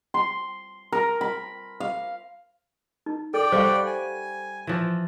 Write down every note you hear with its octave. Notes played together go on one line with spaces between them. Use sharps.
C6
A#4
B5
F5
D#4
A4 D5 G5
G3 C5 F5 F#5 C#6
G#5
E3 F3